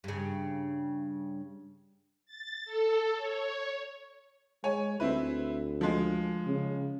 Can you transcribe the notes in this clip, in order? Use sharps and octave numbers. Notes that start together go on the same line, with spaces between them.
G2 C#3
A6
A4
C#5
G#3 C#5 G#5
D2 C4 E4 B4
F3 G#3
C#3